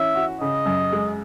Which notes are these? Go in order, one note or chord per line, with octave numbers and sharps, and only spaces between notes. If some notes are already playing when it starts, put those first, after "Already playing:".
Already playing: E3 C#4 E5
F#4
C#3 D#5
F#2
G#3